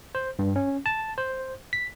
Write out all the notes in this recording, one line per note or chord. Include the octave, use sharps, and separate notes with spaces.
C5
G2
C#4
A5
C5
B6